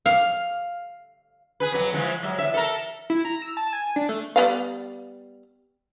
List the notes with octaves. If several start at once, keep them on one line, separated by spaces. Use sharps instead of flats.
F5
G#4 B4
F2 F#3
E3 F3 G#3
F#3 G#3 E5
E2 E5
A4 A#4
E4
A#5
E6
A5
G#5
D4
A3
G3 B3 F5